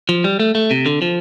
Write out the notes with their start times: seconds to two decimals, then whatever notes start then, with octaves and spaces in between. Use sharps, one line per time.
0.09 F3
0.24 G3
0.40 A3
0.55 A3
0.71 C3
0.86 D3
1.02 F3